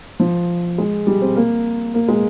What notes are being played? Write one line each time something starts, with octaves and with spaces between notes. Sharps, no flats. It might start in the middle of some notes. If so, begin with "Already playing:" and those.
F3
G#3
G3
C4
A#3
A#3
G#3